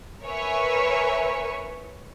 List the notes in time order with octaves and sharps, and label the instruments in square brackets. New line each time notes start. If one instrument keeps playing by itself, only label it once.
[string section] A#4 B4 C#5 E5 G#5